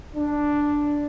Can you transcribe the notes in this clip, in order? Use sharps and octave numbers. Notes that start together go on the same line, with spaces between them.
D4